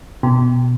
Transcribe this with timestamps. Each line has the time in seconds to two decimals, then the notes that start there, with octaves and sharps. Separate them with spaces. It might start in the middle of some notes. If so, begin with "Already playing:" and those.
0.23 B2